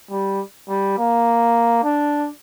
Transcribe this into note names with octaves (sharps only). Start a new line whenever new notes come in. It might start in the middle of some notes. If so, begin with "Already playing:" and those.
G3
G3
A#3
D4